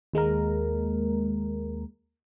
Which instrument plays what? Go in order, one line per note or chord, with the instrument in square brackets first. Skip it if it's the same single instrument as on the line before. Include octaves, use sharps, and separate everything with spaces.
[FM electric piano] D#2 G#3 A#3 A#4